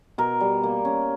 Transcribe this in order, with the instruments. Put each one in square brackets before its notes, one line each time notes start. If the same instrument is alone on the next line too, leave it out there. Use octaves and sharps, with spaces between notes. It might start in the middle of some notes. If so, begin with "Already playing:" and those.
[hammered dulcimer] B2 A#4
G3
A#3
C#4